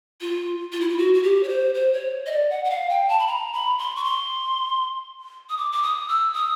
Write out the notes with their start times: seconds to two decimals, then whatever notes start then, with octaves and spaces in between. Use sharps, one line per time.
0.21 F4
0.72 F4
0.81 E4
0.89 F4
0.98 F#4
1.14 F#4
1.23 G4
1.43 C#5
1.48 C5
1.74 C5
1.93 C#5
2.26 D#5
2.32 D5
2.50 F#5
2.65 F#5
2.70 F5
2.89 G5
3.09 A5
3.19 B5
3.27 A#5
3.53 B5
3.78 C6
3.96 C#6
4.04 C6
5.49 D#6
5.58 D6
5.72 D6
5.83 D#6
6.08 E6
6.34 D#6